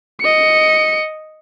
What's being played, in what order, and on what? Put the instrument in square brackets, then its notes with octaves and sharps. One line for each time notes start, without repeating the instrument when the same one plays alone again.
[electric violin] D#5 C#7